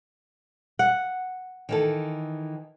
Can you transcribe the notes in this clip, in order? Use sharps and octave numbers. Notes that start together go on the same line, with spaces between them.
F#5
D#3 E3 A4